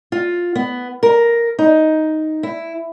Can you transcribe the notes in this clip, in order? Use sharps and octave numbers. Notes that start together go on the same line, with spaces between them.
F4
B3
A#4
D#4
E4